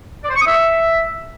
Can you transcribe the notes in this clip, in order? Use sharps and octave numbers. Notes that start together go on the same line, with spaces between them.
D5
C5
C#6
D#6
E5